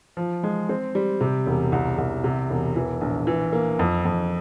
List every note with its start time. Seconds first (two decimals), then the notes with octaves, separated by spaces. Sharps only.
0.17 F3
0.43 G#3
0.69 C4
0.95 G3
1.21 C3
1.46 E1
1.72 C2
1.98 C2
2.24 C3
2.50 E1
2.76 E3
3.01 A#1
3.27 E3
3.53 A#3
3.79 F2
4.05 F2